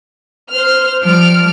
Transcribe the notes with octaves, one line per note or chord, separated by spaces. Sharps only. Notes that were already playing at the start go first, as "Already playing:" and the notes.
C5 F6
F3 G3 F6 D7